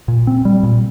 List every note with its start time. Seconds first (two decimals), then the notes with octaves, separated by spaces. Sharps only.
0.08 A#2
0.27 C4
0.45 G3
0.63 A#2